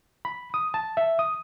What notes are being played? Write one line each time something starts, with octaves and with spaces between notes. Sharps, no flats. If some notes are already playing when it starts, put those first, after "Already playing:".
B5
D#6
A5
E5
D#6